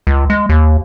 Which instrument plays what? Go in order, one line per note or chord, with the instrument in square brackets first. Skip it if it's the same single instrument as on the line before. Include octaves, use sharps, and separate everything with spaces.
[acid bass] C#2
G#3
D#2